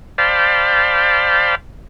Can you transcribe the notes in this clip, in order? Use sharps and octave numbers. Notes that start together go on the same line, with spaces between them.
C5 D5 F5 G5 A5 B5